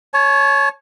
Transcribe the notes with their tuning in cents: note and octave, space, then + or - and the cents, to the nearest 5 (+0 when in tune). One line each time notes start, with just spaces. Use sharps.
C#5 +0 A5 -45